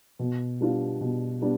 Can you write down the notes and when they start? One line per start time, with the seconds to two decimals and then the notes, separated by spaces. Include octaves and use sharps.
0.19 B2
0.61 G3 B3 D4 F4
1.01 B2
1.42 G3 B3 D4